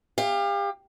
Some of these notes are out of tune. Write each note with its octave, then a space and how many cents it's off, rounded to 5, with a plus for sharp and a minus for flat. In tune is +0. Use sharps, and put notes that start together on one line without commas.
G4 +35 F5 +0